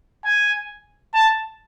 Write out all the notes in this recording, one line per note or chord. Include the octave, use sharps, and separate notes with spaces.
G#5
A5